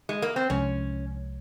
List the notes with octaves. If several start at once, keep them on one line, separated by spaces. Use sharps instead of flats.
G#3
A#3
C4
C2 C3 F3 G#3 C#4